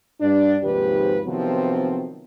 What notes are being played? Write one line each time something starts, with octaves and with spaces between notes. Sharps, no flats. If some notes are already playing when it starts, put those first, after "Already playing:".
G2 D4
D#2 G#2 C3 F3 G4 B4
C3 D#3 F3 F#3 B3 C4